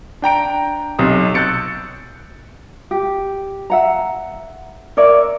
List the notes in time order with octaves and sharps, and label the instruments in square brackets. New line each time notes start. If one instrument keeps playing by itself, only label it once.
[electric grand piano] D4 G5 A#5 D7
B1 C3 D#5 D#6
E6 F#6 G6 A6 C#7 D7
[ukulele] G4
E5 F#5 A#5
A#4 C#5 D5 E5